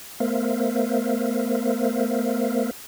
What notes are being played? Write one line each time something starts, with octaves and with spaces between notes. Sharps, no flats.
A3 B3 A#4 C5 E5 F5